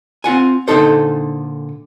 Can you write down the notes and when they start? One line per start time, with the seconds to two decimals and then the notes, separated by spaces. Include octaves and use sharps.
0.24 C4 F4 F#5 G#5
0.68 A#2 D3 A3 D#4 A4 C5